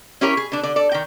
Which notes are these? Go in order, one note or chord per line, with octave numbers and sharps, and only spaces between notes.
C#4 E4 G4 A#4 C#5
G#4
D3 D4
D3 D5
A4 D5
D#3 G5